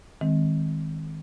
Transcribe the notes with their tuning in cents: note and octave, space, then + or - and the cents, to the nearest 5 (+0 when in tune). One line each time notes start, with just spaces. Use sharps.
D#3 +20 G#3 +0 C4 +0